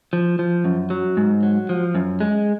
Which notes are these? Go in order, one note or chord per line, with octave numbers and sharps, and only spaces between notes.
F3
F3
F#2
F#3
G#2
F#3
F3
F#2
G#3